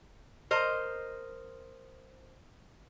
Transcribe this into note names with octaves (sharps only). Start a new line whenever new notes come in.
A#4 C5 D#5